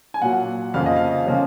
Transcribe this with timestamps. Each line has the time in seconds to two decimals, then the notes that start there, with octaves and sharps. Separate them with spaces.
0.14 G#5
0.22 A#2 F#3 A#3 F#5
0.74 F2 C#3 F3 A#3 C#4 F5
0.86 D#5
0.97 F5
1.26 C#3 F3 A#3 C#4